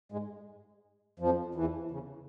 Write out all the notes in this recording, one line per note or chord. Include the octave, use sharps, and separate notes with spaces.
G#2 G#3
F2 F3
E2 E3
C#3